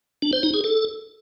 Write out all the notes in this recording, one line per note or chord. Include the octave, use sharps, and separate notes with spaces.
D4
C5
D#4
G#4
A4